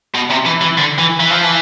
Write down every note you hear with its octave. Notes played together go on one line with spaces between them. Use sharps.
B2
C3
E3
E3
D3
E3
E3
F3
E3